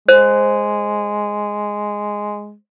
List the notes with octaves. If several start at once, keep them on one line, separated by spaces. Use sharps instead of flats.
G#3 C5